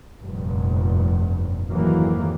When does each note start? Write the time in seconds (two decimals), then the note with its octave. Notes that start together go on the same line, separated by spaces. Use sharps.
0.21 F1 G2 A#2
1.71 F2 G#2 D#3 E3 F#3 A#3